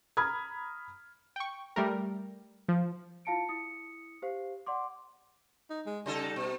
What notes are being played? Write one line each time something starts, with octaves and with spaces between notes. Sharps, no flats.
A#5 B5 D#6 F6 G#6
G5 C#6
G3 A3 A#4
F3
E4 F4 F5 A5 C#7 D7
E4 D#6 C#7
G4 C5 F5 C7
D5 F#5 C6 D6
D#4
G#3
C#3 G3 D#4 A4
B2